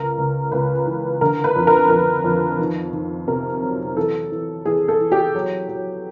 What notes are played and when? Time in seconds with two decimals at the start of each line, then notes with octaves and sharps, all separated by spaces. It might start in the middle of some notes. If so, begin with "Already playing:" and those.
Already playing: C#2 A#4
0.18 C#2
0.52 C#2 B4
0.86 E3
1.21 D3 A#4
1.44 B4
1.56 F2
1.67 A#4
1.89 F2 A#4
2.24 F2
2.59 D#3
2.93 D#3
3.27 C3 A#4
3.62 F#3
3.96 E3 A4
4.31 E3
4.65 E3 G#4
4.88 A4
5.00 E3
5.12 G4
5.35 F#3
5.69 F#3